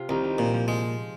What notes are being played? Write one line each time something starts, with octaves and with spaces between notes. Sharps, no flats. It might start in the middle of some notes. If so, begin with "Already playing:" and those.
Already playing: C3 F4
C2 D#3 D#4
D#3
A#2 F3
F3
F3 G#3